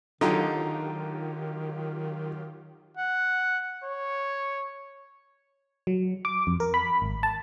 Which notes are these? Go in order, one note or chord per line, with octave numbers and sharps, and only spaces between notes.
D3 D#3 F#3 D#4 F4 G4
F#5
C#5
F#3
D6
F2
A#4
B5
G#1
A5